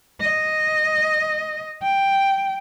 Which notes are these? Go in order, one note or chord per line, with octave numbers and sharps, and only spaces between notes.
D#5
G5